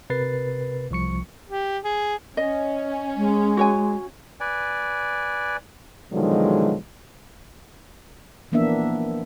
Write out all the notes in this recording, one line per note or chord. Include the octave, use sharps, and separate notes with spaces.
C3 A#4 B4 A6 C7
C2 F3 C#6 C#7
G4
G#4
C#4 D#5
G#3
F#4 C#5 G#5
B4 D5 G#5
B2 D3 D#3 F3 F#3 G#3
E3 F3 A#3 B3 D4 E5